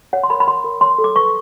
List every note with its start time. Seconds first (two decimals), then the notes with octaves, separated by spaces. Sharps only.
0.13 C#5 F#5
0.23 C6
0.30 A#4 B5
0.40 B5
0.47 C#5 C6
0.64 A#4
0.81 C#5 C6
0.98 A4
1.04 D6
1.16 B4 C#6